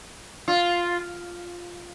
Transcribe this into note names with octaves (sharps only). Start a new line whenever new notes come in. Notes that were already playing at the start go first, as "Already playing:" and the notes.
F4